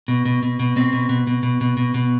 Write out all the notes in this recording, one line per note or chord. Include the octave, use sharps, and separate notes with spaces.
B2
B2
B2
B2
B2 C4
B2
B2
B2
B2
B2
B2
B2